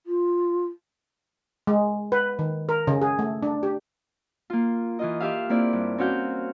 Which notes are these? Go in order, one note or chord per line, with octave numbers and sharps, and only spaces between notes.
F4
G#3
B4
D#3
A#4
C#3
G#4
A3
D4
G4
A#3 F4
E3 F4 D#5
F4 G4 E5 F5
A#3 C4 E4 D5
G2
C4 C#4 F#4 F5 G6